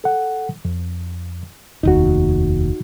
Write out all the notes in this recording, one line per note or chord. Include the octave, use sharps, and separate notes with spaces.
A4 F#5
F2
F1 D#2 D#4 F#4